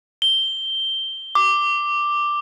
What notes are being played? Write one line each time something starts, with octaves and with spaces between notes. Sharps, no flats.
G7
D6